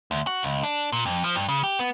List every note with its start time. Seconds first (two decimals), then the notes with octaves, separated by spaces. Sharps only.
0.11 D2
0.27 F#4
0.43 C#2
0.63 D4
0.92 A#2
1.06 F2
1.24 F3
1.36 G2
1.49 C#3
1.63 G4
1.79 B3